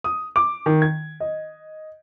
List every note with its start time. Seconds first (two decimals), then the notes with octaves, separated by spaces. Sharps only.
0.04 D#6
0.36 D6
0.66 D#3
0.82 G#6
1.20 D#5